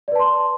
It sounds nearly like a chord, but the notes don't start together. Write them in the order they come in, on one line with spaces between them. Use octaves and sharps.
D5 B4 A5 C6